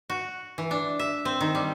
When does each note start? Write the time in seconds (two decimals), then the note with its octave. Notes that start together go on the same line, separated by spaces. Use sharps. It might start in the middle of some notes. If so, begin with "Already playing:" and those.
0.10 F#4
0.58 E3
0.71 D4
0.99 E5
1.25 C4
1.41 D#3
1.55 G3